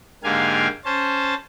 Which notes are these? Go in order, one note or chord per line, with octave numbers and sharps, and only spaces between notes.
G#2 D3 A#3 G4 F5 G#5
C#4 C5 A5